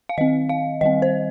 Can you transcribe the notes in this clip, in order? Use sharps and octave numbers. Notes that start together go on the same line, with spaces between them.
F5
D#3 C4 D#5
F5
D#3 G3 C4 D#5
C5